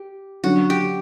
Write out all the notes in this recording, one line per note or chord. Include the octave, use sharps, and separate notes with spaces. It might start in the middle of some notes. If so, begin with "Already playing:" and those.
Already playing: G4
F#2 D3 F#3 F#4
G4